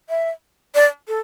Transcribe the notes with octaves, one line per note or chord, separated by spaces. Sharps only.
E5
D5
A4